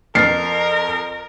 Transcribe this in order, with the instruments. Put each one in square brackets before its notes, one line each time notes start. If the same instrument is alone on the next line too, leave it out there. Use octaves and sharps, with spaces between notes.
[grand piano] F2 [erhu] A#4 [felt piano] F6 A6 C7